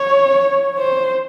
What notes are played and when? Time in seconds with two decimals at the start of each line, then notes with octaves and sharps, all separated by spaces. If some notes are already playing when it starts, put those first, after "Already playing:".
Already playing: C#5
0.79 C5